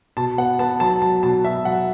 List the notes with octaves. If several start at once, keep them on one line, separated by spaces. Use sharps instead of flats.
B2 A5
B3 F#5
B3 A5
F#3 A5
F#3 A5
B2 A5
B2 E5
F#3 F#5